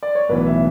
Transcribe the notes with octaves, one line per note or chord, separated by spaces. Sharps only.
D5
C#5
B1 A2 E3 B3 B4
E5